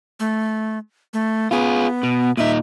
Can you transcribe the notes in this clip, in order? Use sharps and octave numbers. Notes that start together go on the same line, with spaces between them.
A3
A3
B3 F4 G#4
B2
A#2 D#4 E5